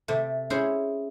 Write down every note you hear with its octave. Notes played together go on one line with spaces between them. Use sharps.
C3 A3
C#4 E4 G#4 C5